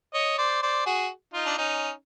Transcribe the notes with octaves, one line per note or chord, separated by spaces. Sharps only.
C#5 D#5
C5 D5
C5 D5
F#4 G#4
D#4 F4
D4
C#4 D#4